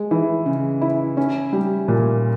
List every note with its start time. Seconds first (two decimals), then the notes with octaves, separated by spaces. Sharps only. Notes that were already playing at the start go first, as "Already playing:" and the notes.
Already playing: G#3
0.11 E3
0.46 C#3
0.81 E4
1.17 C#4
1.52 G3
1.88 A#2